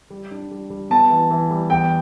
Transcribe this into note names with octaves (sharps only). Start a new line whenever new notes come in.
G3
D4
G3
G3
B3 A5
E3
E3
G3
E2 G5